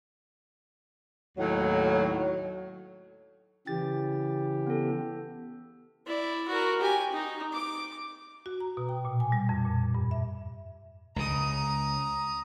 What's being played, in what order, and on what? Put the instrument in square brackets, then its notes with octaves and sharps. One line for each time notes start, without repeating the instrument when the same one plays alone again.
[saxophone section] D#2 A2 F#3
[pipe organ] C#3 E3 G4 [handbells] A6
[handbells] B3 A4
[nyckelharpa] E4 D5
F#4 A#4
G4 G#5
D#4
D6
[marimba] F#4
A#5
B2
G5
A#2
G#5
G3
F2
A#2
G2
E5
[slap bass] C#2 C#3 [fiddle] A#5 D#6